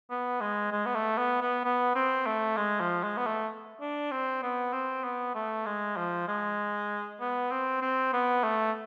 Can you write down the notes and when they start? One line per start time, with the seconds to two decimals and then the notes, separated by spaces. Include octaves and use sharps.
0.10 B3
0.41 G#3
0.72 G#3
0.86 B3
0.95 A3
1.18 B3
1.41 B3
1.64 B3
1.95 C4
2.26 A3
2.57 G#3
2.80 F3
3.03 G#3
3.17 B3
3.26 A3
3.80 D4
4.11 C4
4.42 B3
4.73 C4
5.04 B3
5.35 A3
5.66 G#3
5.97 F3
6.28 G#3
7.20 B3
7.51 C4
7.82 C4
8.13 B3
8.43 A3